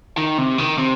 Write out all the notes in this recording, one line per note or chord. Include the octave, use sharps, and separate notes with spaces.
D#3
C3
D#3
C3